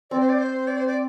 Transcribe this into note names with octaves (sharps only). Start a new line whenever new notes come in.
C4 D5
C5
D5
C5
D5
C5
D5